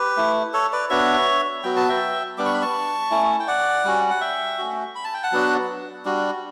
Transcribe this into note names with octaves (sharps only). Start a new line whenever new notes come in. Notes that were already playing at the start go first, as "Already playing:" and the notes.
Already playing: G4 B4
A3 E4
A4 C#5
B4 D5
B3 D4 F#4 C#5 E5
F#3 B3 F#4 G5
A5
E5 G5
G3 B3 D4 D6
C#6
B5
A5 C#6
A3 C#4 E4
G5
D5 F#5
G3 C#4 F#4
F#5
E5 G5
A3 C#4 F#4
B5
A5
G5
F#5 A5
F#3 B3 D4 F#4
G3 D4 F#4